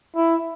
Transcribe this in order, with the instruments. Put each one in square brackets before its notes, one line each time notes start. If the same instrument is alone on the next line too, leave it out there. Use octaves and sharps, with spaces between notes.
[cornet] E4